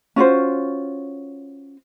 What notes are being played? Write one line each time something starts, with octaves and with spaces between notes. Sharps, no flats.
C#4 F4 F#4 C5